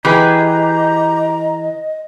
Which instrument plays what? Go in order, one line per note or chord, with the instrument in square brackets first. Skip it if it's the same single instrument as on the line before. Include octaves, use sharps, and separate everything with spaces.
[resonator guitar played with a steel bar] E3 G#4 B4 [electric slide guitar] G4 [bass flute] D#5 [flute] A#5